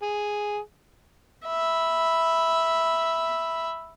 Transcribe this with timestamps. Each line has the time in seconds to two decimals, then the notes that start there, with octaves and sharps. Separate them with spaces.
0.02 G#4
1.46 E5 B5